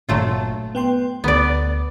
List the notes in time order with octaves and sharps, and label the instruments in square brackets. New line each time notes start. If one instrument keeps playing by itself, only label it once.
[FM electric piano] G1 A#2 [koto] F#3 A3 F4
[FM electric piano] B3 G5 C6
[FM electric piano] D2 [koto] B3 D5